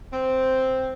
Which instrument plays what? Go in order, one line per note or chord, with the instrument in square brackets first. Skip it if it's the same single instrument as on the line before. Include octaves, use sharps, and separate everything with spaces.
[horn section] C4